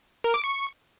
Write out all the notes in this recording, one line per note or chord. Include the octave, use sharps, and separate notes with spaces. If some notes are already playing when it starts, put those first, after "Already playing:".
A#4
D6
C#6